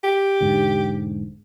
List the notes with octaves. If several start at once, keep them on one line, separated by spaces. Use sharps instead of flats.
G4
E1 G#2 D3